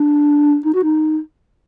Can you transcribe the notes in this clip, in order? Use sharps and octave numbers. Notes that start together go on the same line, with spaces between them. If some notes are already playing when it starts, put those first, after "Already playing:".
Already playing: D4
D#4
F#4
D#4